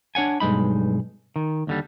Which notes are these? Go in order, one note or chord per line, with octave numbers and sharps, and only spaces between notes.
D4 C#5 F#5 G#5
B1 G2 G#3 D#4 B5
D#3
D#2 D3 G3